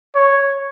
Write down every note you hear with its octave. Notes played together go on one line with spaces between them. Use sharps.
C#5